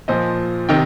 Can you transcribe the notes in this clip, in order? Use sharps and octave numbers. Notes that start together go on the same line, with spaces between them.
A#2 F3 C5 D#5
C3 D#3 D#5 G5